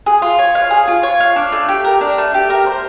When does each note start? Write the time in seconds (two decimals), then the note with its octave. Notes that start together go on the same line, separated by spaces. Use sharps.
0.06 G#4
0.22 F4
0.39 C#5
0.55 F5
0.71 G#4
0.88 F4
1.03 C#5
1.20 F5
1.36 D4
1.52 A3
1.69 G4
1.84 A#4
2.01 D4
2.18 A3
2.34 G4
2.50 A#4
2.66 C5